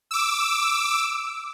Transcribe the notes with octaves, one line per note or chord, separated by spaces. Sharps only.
D6 E6